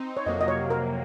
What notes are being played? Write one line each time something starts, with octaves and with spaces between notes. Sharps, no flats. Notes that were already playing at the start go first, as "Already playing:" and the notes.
Already playing: C4 D#4
C#5
F2 C3 F#3 A#3 D#5
D#5
C#5
A#4